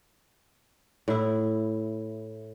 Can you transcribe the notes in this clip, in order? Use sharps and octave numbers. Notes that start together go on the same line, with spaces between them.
A2 E4